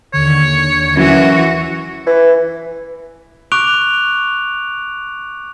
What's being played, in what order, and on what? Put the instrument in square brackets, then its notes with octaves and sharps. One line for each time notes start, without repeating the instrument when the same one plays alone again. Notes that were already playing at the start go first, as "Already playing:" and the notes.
[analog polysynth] D#2 D3 [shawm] C#5
[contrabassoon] F#2 [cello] E3 F#4
[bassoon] E3
[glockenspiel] C#6 D6 F#6 D7 F7